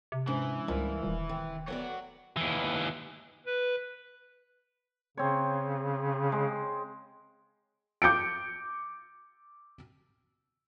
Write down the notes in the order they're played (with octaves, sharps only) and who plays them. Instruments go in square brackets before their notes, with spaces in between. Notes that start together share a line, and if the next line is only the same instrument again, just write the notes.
[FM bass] C3
[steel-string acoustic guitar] G#2 [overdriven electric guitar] E3 [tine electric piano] G#3 C#4 D4
[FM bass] C#2 [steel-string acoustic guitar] G#2 G3 A#3
[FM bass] D#1 [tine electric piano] D#3
[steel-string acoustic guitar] C3
[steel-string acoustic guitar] A3 B3 D5 [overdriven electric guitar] C#5 F#5
[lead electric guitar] D#2 E3
[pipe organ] B4
[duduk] C#3 [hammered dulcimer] C4 C#5
[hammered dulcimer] G#3
[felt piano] D6 G6 C#7 D7